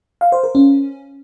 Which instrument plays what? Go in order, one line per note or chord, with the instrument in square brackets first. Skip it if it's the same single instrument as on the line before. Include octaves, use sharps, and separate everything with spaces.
[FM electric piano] F5
C5
A#4
C#4